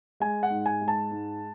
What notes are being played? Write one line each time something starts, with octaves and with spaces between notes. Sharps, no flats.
G#3 G#5
F#5
G#2
G#5
G#3
A5
G#2